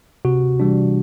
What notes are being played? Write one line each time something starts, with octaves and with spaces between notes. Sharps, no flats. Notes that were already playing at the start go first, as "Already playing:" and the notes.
C3 F#4
E3 G3 D4